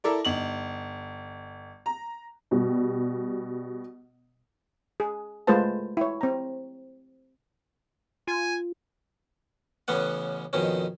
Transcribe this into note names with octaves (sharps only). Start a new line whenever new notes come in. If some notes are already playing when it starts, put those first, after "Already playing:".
E4 A4 A#4 D5
G1 D#4 F#7
A#5
B2 G3
G#4
G#3 A3 F4 B4 C5 A5
E4 C#5
C4 A#5
F4 G#5
A1 A2 C#3 B3 C#4 F#5
F2 B2 D#3 C#4